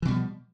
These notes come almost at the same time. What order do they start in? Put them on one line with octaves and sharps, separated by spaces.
E3 B2 G3 F3